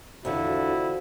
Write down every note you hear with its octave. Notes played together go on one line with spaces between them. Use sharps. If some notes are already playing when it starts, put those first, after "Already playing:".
E2 D3 F3 E4 F#4